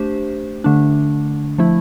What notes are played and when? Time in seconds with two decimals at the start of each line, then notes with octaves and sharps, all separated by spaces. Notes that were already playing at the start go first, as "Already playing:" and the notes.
Already playing: A3 D4 G4 C5
0.64 D3 A3 D4
1.58 F3 A3 E4